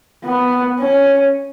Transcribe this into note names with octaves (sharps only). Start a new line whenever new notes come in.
B3
C#4